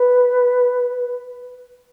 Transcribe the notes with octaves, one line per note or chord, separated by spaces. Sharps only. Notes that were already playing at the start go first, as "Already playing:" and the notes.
Already playing: B4